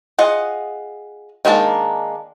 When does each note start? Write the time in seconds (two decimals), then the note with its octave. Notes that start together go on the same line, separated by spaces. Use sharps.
0.19 F4 G#4 D#5 F#5
1.45 D#3 G#3 A#3 D4 A5